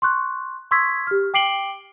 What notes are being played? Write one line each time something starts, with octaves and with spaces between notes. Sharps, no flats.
C6 C#6 F#6
C6 C#6 D#6 E6 G#6 B6
G4 F6
G5 D6 C7 D7 F#7 G7